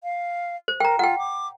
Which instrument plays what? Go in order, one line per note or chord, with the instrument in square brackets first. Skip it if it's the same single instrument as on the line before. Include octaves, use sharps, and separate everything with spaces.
[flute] F5
[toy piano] C5
[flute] A#4 [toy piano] G5 A#5
[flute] F4 [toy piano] F#5 G5
[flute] D6